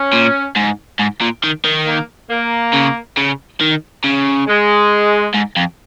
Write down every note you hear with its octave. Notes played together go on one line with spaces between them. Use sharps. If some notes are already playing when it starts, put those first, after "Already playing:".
Already playing: C#4
A#2
G#2
G#2
A#2
D#3
D#3
A#3
A#3
C#3
C#3
D#3
C#3
G#3
G#2
F2